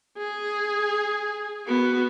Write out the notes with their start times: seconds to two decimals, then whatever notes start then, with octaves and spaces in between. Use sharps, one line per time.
0.18 G#4
1.67 B3 F#4